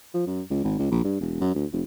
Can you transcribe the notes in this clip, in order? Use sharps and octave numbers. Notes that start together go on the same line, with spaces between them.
F3
F#2
C#2
G#1
C#2
A#1
G2
E1
F#2
D2
F1